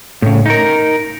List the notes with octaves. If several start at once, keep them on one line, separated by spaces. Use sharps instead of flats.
A2 C#3
D#4 A#4